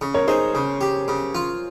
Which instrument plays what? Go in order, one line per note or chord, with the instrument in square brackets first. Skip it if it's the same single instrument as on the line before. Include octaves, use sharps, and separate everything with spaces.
[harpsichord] C#3
[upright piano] A#4 C#5
[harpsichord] D#4 [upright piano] G#4 C5
[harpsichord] C#3 [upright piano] G#4
[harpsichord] G4
C#3
F4